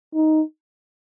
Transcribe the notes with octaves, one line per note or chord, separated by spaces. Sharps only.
D#4